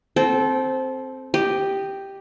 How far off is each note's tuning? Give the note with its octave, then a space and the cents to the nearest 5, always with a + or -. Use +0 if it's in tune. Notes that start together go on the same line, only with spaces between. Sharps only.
C4 +5 A4 -25 G5 -15
G4 +0 D#5 -20